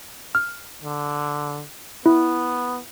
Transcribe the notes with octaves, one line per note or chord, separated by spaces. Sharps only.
F6
D3
B3 E4